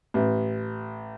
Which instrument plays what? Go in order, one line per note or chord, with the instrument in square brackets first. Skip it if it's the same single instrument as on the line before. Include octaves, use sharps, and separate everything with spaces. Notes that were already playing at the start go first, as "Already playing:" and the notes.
[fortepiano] A1